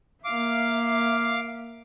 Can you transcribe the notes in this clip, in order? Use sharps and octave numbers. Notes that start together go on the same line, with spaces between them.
A#3 E5 F5 D6